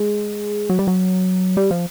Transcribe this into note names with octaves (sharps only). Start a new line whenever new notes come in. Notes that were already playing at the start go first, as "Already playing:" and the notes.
Already playing: G#3
F#3
G3
F#3
G3
F3